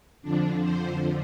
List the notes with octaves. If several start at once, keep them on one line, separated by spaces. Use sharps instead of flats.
F2 D3 F3 D4
C5